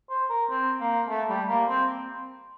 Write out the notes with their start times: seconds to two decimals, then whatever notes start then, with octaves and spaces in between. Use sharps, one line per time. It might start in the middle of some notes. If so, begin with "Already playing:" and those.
0.10 C5
0.30 A#4
0.50 C4
0.80 A#3
1.09 A3
1.29 G3
1.49 A#3
1.68 C4